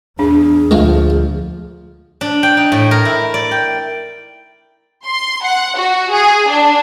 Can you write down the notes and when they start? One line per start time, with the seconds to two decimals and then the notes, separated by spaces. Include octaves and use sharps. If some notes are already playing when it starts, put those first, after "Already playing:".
0.19 E2 D4 G#4
0.71 D2 F3 G#3 F4 F5
2.21 D4
2.43 G5
2.57 D#4
2.72 A2
2.91 A#4
3.05 E4
3.34 D5
3.51 G5
5.05 C6
5.45 F#5
5.78 F#4
6.12 G#4
6.48 D4